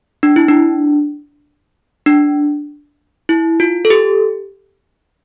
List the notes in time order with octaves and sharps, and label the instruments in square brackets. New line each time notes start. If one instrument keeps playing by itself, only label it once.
[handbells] D4
E4
D4
D4
E4
F4
A4
G4